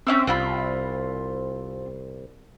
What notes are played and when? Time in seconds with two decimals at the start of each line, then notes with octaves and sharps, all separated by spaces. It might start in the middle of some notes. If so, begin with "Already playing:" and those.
0.07 C4 C#4 E5 E6
0.27 C2 C4 F4 B5